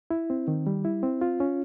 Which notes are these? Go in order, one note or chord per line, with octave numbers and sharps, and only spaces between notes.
E4
C4
D#3
G3
E4
C4
F4
C#4